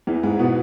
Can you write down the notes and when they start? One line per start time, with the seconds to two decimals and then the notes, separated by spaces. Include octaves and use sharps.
0.07 E2 E3
0.23 G#2 G#3
0.39 B2 B3